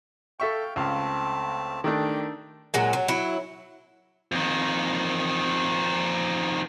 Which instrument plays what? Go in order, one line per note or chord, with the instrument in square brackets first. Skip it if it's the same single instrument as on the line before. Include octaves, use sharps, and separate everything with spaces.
[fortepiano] A4 E5 C#6 [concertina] F5 G5
[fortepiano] C#2 F5 [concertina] A3 C4 A5
[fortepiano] D#3 A3 D4 [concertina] G4 G5
[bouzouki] A#2 F#3 G#3
F#3
F#3 E4
[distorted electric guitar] F2 D#3